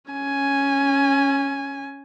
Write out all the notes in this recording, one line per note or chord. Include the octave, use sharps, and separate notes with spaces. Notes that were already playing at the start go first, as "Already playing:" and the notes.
C#4 G#5